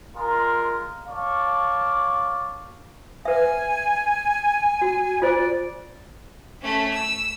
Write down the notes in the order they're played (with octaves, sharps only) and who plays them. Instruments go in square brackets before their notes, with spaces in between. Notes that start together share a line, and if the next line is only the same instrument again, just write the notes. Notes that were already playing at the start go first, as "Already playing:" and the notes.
[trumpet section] G#3 F4 A#4
C#5 D5 F5 A5 C#6
[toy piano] B4 E5 [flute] G#5
[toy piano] F#4
[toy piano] F4 C5 [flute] D5
[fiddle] A3 C#4
E6